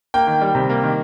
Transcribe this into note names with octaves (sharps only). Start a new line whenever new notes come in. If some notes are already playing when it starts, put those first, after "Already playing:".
A#3 G5
D#3
G3
C3
A#3
D#3